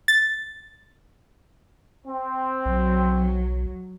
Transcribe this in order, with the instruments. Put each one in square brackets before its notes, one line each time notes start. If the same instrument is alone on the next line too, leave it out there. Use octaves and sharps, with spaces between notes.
[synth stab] A6
[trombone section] C4
[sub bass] B1 [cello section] F#3